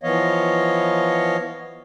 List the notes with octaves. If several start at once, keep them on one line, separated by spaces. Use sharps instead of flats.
E3 F3 B3 C#5 D#5 F5